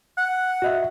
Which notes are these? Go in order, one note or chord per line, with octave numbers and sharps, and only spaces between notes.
F#5
F#4 D#5 E5